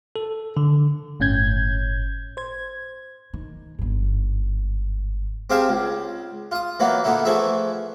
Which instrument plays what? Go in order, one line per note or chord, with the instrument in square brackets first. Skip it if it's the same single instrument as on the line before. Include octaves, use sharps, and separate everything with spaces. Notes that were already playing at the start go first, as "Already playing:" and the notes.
[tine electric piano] A4
D3
[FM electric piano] G1 A2 C#4 G6 G#6
C5 G#6
[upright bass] D#3
G1 G#2
[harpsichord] C4 G4 G#4 F5 G5 A5
C#2
F4 D#6
E3 F#3 A#3 B3
A#2 D3 B3 D#4 E4
E3 F3 A3 G#4 E5